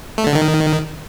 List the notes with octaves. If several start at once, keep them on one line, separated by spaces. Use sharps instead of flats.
A3
D3
D#3